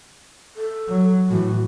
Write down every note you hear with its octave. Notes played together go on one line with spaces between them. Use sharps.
A4
F#3
A2 E3 F#4